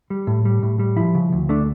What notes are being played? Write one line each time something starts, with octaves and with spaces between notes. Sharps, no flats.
G3
A2
G3
A2
G3
F3 E4
C#3
D2
A3 D4